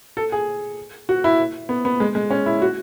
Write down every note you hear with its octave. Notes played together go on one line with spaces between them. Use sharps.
A4
G#4
F#4
E4
B3
B3
G#3
G#3
C#4
E4
F#4